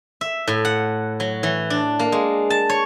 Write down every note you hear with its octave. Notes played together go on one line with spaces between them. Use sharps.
E5
A2
F#5
F#3
E3
D4
A#3
G#3
A5
C#5